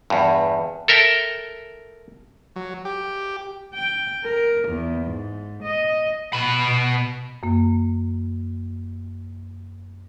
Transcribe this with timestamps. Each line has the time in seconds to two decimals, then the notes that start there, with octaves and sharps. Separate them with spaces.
0.10 E2 G2
0.88 A4 A#4 E5 G5
2.56 F#3
2.85 G4
3.74 G5
4.24 A#4
4.68 E2
5.06 G#2
5.63 D#5
6.33 B2 B5
7.43 F#2 A#3